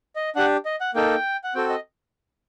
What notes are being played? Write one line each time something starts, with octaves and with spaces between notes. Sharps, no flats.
D#5
D4 G4 F#5
D#5
F#5
A#3 D#4 A4 G5
F#5
C4 F#4 A4 G5
D#5